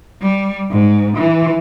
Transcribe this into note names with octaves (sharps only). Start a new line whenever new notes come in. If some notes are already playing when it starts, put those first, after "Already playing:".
G3
G#2
E3